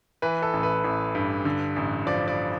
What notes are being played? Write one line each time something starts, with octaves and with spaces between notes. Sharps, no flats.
E3 B4
A4
A1
B4
A1
G2
D3
A1
F3 D5
D5